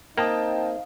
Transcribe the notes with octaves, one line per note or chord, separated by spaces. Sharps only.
A#3 C4 D#4 F5 G5 A5 D#6